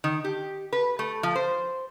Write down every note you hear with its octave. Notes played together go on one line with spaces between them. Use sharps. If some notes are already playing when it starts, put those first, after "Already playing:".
D#3
G4
B4
A3
F3
C5